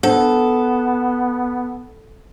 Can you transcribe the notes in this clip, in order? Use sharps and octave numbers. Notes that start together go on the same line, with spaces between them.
B3 D4 A4 C5 F#5